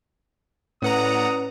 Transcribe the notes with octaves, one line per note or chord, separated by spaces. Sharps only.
A2 C#4 B4 D5 F#5 A#5 D#6